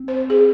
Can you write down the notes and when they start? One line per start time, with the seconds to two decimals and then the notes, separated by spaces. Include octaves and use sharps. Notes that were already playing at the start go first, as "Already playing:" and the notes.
Already playing: C4
0.08 C5
0.30 G#4